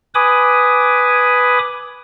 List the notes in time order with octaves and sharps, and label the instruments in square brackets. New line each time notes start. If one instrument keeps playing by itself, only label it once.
[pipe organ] B4 G#5 B5 D6 D#6